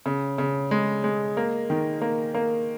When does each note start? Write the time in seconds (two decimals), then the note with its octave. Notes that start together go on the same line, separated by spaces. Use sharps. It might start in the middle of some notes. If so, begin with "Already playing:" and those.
0.06 C#3
0.38 C#3
0.71 G#3
1.04 G#3
1.37 A#3
1.70 D#3
2.01 A#3
2.34 A#3